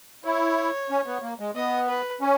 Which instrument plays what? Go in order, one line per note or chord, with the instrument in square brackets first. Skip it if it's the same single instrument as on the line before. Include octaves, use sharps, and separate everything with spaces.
[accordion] E4 [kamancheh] C#5
[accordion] C#4
B3
A#3
G#3
[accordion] B3 [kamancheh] D#5
[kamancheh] B4
[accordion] C#4